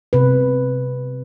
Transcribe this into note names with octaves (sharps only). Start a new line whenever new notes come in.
C3 B4